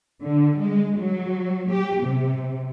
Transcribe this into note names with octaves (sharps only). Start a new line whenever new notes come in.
D3
G#3
F#3
G4
C3